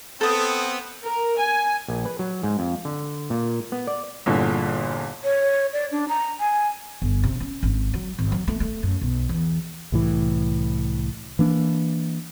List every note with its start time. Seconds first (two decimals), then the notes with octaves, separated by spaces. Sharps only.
0.21 B3 C4 A4 D#6
1.02 A#4
1.39 G#5
1.88 A#1
2.05 B4
2.19 F#3
2.43 G#2
2.59 F2
2.85 D3
3.30 A#2
3.72 B3
3.87 D5
4.26 G1 E2 A#2 D3
5.24 C#5
5.73 D5
5.92 D4
6.09 A#5
6.40 G#5
7.02 G1
7.24 C3
7.40 C#4
7.63 G#1
7.94 F#3
8.19 G#1
8.32 F#3
8.48 A3
8.60 A3
8.83 F#2
9.01 B1
9.29 E2
9.92 C2 A2 E3
11.39 E3 A#3 D4